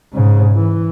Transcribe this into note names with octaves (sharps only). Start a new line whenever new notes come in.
G#2 C#3
E3